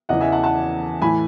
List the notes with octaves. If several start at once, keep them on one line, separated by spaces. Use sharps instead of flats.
E2 C#3 E3 D#5 F#5
E5 G#5
F#5 A5
F#5 A5
A2 E3 G#5 B5